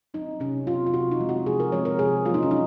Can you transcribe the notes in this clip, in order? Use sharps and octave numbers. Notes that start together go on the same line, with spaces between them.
F#3 C4 D#4
C3 C#4
F#3 C4 F4
F4
C3 F#4
D#4
F3 G#3 C4
F#4
C3 G#4
A#4
F3 G#3 C4 C#5
A#4
C3 G#4
F#3 A#3 D#4 F4
C#4
D#4